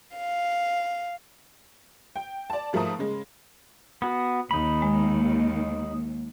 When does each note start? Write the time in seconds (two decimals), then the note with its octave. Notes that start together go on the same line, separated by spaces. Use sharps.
0.17 F5
2.16 G5
2.50 D5 A5
2.73 G#2 F3 A3 A#4 A5 D#6
2.99 C#3 G#3
4.02 B3 F#4
4.51 D#2 D#4 B5
4.82 G#3